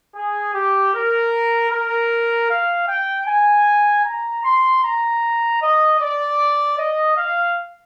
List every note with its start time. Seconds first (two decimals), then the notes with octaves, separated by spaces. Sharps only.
0.15 G#4
0.54 G4
0.94 A#4
1.70 A#4
2.50 F5
2.89 G5
3.27 G#5
4.05 A#5
4.44 C6
4.83 A#5
5.61 D#5
6.00 D5
6.79 D#5
7.17 F5